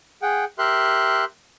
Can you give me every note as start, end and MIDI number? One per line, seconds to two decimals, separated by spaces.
0.22 0.45 68
0.22 0.45 78
0.22 0.45 79
0.59 1.25 67
0.59 1.25 70
0.59 1.25 76
0.59 1.25 84
0.59 1.25 90